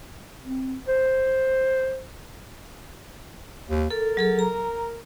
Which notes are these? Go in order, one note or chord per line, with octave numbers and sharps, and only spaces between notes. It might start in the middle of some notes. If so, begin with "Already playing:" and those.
C4
C5
D#2
A4 A#4
F#3 G#4 A4
A#5